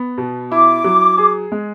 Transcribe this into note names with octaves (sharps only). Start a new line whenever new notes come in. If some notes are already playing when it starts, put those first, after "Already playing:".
Already playing: B3
B2
E4 D6
F#3
G#4
G#3